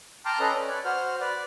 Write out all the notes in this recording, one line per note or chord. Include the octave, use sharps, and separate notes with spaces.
G5 A5 A#5 C6 D6 F6
C#4 A4 B4 D#5 A#5
C#4 D5
B4 C#5 D5
F#4 C5 F6
B4 D5